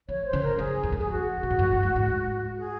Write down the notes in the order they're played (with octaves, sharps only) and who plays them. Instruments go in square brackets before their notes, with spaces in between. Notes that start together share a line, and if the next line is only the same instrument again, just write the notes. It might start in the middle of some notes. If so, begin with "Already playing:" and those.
[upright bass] F3 [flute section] C#5
[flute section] C5
[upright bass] C#3
[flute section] A#4
[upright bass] F#2 [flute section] G#4
[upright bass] F2
F#2
[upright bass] F2 [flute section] G#4
[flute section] F#4
[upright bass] A#2
G#2
F#2
F#2
G#2
G#2
[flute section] G#4